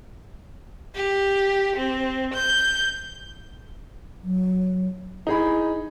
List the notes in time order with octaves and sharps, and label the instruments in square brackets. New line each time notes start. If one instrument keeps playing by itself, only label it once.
[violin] G4
C4
G6
[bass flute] F#3
[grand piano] D#4 G#4 B5 [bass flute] E4